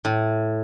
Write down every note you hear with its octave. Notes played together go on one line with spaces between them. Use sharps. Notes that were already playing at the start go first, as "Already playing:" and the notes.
A2